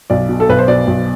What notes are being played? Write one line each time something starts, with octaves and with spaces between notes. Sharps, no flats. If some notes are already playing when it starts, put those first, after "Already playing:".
B1 D5
B2
A4
B1 B4
C5
B2 D5
B1